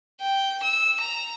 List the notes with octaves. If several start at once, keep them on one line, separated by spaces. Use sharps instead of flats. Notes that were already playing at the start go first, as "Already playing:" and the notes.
G5
E6
A#5